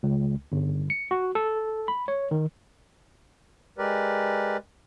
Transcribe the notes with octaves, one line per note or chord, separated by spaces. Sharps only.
C#2
G1
C#7
F#4
A4
B5
C#5
D#3
G#3 G4 A#4 B4 D5